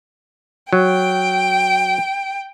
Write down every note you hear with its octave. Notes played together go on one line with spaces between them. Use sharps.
F#3 G5